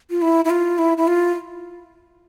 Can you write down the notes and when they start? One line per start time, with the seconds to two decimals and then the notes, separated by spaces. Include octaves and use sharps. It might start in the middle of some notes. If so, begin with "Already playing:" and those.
0.10 F4
0.22 E4
0.45 E4
0.50 F4
0.78 E4
0.97 E4
1.07 F4